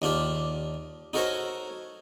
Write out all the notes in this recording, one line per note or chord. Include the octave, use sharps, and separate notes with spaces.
D#2 D4 F4 G4
D#4 F#4 A4 A#4 C5 C#5